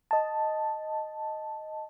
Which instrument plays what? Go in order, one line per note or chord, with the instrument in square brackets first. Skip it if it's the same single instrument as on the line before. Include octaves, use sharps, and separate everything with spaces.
[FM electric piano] D#5 A5